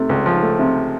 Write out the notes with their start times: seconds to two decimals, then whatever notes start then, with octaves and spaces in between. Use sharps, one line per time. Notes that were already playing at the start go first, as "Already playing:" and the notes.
Already playing: C3 A3
0.09 C#2
0.26 F3
0.43 A3
0.59 C3